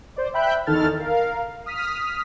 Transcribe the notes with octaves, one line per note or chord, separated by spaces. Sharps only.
C5 D5
E5 G5 B5 F#6 G6
E2 D#3 A4 F6 A6
A#4 F5
D#6 F6 B6